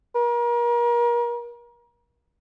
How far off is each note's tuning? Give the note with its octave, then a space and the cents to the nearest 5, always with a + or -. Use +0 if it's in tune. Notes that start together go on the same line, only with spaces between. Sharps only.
A#4 +35